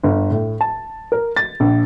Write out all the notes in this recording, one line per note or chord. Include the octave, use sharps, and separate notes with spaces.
G1
A2
A5
A#4
A6
A#1